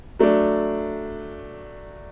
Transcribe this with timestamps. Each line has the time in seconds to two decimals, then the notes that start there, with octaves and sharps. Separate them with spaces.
0.19 F#3 A3 D4